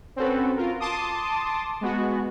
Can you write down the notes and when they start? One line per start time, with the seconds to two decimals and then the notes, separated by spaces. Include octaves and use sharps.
0.16 C4 C#4 F#4 A4 B4
0.57 F4 A#4
0.80 A5 C6 D6 D#6
1.81 G#3 B3 F#4